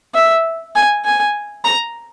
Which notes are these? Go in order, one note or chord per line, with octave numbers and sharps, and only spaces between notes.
E5
G#5
G#5
A#5